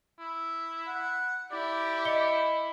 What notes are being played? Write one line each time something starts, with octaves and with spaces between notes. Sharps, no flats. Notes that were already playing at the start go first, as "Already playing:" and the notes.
E4
F#5
E4 G4 D5
D#5 C#7 G7